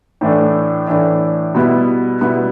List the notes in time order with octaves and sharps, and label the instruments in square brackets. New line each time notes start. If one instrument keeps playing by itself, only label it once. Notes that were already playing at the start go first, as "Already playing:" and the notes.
[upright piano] A2 E3 A3 D4
A2 E3 A3 D4
B2 G3 B3 E4
B2 G3 B3 E4